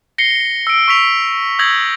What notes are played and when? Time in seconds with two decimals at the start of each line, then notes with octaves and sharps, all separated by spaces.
0.18 A#6 C7 C#7 G7
0.67 E6 D7
0.88 C#6 E6 B6 F7
1.59 D#6 E6 G6 G#6 A#6 F#7